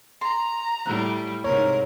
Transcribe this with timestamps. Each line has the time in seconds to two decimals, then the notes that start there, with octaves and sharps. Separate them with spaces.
0.21 A#5 C6
0.86 A2 G3 F#6
1.44 G#2 C3 A#4 C#5